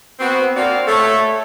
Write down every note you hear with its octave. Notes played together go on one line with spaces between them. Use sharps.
B3 C4 F#4
A#3 C4 F#4 D5 F5
A3 A4 C#5